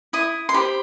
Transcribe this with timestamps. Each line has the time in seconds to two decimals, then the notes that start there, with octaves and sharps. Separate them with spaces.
0.13 E4 D#6
0.49 C6
0.54 G4 C5 B5